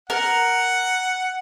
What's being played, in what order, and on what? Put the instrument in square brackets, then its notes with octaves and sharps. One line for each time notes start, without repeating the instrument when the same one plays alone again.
[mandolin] A#4 [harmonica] F#5